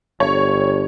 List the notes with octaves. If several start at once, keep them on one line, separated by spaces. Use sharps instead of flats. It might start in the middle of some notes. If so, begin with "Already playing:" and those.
G1 C#5